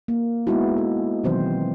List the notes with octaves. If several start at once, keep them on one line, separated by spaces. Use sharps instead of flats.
A#3
G#3 B3 D#4 E4 F#4
A4
B2 D#3 E3 F#3 C4 C5